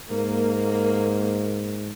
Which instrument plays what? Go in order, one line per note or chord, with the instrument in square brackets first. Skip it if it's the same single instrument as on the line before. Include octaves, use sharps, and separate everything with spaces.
[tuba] G#2 [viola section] A#3